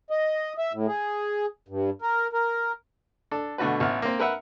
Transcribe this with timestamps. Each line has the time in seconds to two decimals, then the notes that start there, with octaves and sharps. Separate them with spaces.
0.10 D#5
0.58 E5
0.73 A2
0.88 G#4
1.68 G2
2.02 A#4
2.33 A#4
3.31 D4 A4
3.58 B2 D3 A3 F#4 B4
3.80 A1 B3 F6
4.02 A#3 C4
4.19 A#4 B4 E5 F#5